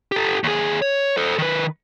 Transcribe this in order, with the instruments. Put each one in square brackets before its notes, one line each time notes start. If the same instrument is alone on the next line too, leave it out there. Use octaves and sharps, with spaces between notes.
[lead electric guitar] G4 A4
D#2 G#4
C#5
A4 C5
D#3 B4